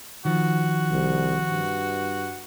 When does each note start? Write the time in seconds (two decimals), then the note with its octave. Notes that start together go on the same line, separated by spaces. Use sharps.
0.25 D#3 F3 F#4
0.91 C2
1.50 G2